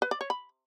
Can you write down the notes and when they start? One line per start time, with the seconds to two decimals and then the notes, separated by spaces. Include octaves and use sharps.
0.02 B4
0.11 D5
0.21 C#5
0.30 B5